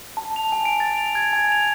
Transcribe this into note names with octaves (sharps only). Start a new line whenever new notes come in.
A5
F7
G#5
D7
A6
F7
G#6
G#5
F7